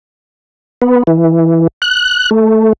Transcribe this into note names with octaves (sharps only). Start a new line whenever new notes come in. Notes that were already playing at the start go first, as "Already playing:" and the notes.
B3
E3
F#6
A3